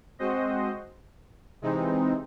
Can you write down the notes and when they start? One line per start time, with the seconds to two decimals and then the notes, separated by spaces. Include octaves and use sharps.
0.19 G#3 C4 F#4 C5 D#5
1.62 C3 E3 G#3 C4 D#4